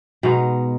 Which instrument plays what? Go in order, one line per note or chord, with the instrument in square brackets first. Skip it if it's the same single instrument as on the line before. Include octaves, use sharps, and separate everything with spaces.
[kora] B2 G#3 B3 D#4